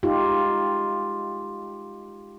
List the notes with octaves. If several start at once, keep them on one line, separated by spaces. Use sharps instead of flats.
G#3 D#4 F4 G4